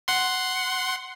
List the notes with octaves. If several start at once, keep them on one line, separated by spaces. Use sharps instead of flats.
F#5 C6